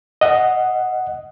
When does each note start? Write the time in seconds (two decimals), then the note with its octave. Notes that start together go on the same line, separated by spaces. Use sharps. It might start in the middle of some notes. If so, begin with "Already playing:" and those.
0.21 D#5 F#5